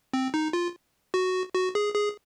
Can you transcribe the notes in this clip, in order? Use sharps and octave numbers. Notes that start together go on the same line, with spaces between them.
C4
D#4
F4
F#4
F#4
G#4
G#4